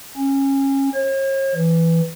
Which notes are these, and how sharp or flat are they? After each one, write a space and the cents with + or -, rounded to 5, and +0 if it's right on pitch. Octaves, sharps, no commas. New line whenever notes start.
C#4 -20
C#5 -45
E3 +5